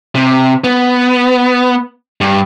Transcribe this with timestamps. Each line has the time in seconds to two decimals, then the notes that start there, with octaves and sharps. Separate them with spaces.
0.16 C3
0.64 B3
2.21 G2